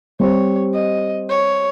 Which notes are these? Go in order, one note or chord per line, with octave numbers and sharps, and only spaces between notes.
G3 C4 G4 C5 C#5
D#5
C#5